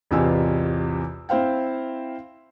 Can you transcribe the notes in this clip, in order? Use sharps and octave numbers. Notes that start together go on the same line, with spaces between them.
A1 E2 C3 F4 G#5 E6
C4 E4 C5 F5 G5